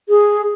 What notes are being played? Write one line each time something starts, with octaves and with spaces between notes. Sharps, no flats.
G#4